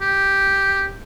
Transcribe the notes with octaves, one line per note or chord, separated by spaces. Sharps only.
G4